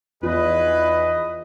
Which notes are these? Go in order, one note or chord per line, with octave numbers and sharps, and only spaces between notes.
E2 D#4 F4 G#4 B4 D#5